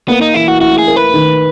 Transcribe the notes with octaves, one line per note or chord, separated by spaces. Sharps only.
A#3 B3
D#4
E3 E4
F#4
E4 F#4
G#4
A#4
B4
D#3